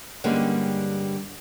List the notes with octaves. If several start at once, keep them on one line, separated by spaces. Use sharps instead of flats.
G2 D3 G3 G#3 A#3 C#4